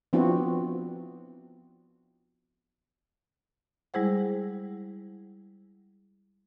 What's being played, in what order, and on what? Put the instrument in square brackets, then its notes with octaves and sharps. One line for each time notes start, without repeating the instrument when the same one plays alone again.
[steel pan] F3 B3 C4 D4 E4 F#4
[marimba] G3 G#3 E4 G#4 C5 F#5